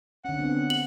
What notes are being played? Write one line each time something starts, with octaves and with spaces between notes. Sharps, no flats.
D3 C#4 F#5
B3 C4 D4
F#7